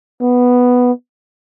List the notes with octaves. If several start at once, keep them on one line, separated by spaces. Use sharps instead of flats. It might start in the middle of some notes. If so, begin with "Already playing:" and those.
B3